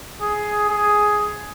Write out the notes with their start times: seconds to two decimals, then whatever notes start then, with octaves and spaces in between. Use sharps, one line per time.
0.22 G#4
0.69 G#4